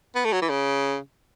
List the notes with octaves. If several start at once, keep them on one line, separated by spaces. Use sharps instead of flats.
B3
A3
F#3
E3
C#3